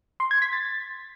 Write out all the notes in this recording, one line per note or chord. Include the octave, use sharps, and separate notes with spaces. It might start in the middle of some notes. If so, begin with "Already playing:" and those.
C6
G#6
B6
A6